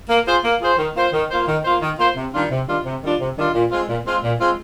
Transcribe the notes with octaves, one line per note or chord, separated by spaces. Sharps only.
A#3
F4 G#4 C5
A#3
F4 G#4 C5
D#3
A#3 F4 C5
D#3
A#3 F4 C5
D#3
A#3 F4 C5
D#3
A#3 F4 C5
C3
D#3 G3 D4 F4
C3
D#3 G3 D4 F4
C3
D#3 G3 D4 F4
C3
D#3 G3 D4 F4
A#2
G#3 C4 F4
A#2
G#3 C4 F4
A#2
G#3 C4 F4